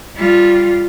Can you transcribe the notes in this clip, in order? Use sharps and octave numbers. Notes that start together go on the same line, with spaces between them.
G3 F4